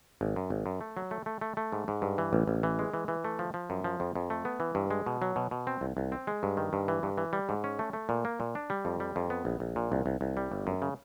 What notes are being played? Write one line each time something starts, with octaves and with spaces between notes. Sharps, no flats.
G#1
F#2
G#1
F#2
A3
F#3
A3
A3
A3
A3
G#2
G#2
G2
E3
A1
A1
E3
G#3
E3
E3
A3
F3
F3
F#2
F3
F2
F2
A3
B3
E3
G2
G#3
B2
F#3
B2
B2
C4
C2
C2
C4
G#3
G2
D#3
G2
E3
G2
E3
G3
G#2
C#4
A3
A3
A#2
A#3
A#2
D4
G3
F2
G3
F2
B3
A#1
A#1
A#2
C2
C2
C2
G3
G1
F#2
C#3